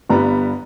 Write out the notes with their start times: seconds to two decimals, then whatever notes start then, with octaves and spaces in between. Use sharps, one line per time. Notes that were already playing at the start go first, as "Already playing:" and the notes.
0.09 G1 G2 G3 B3 A#5